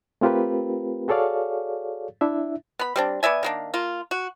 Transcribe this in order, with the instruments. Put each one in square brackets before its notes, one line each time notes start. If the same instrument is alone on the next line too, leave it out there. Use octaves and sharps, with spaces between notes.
[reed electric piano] A3 C4 F4 G4 A#4 B4
F#4 G#4 A4 C#5 D5 F5
D4 E4 E5
[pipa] B3 B5
G3 C4 D4
B3 D5 E5 G#5
D#3 A#3 D4
A#3 F4
F#4